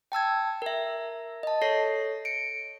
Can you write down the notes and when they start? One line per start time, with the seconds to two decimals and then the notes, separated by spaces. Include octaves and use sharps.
0.12 G5 A5 E6 G#6
0.62 A#4 E5
1.43 D#5 A5
1.62 A4 C#5 A#6 C7
2.25 C#7 D7